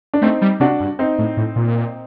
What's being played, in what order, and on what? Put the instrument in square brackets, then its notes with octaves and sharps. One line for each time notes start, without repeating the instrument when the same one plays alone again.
[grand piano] D4
[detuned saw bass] A3 [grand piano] C4 D#4
[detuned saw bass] G3
[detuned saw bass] C3 [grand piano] D4 F#4
[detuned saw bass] G2
[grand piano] C4 D#4
[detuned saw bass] A2
A2
A#2